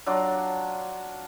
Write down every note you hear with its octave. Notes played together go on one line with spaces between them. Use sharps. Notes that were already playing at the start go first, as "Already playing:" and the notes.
F#3 D4 F4